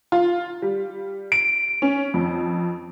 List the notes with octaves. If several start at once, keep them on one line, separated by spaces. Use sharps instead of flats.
F4
G3
D7
C#4
F2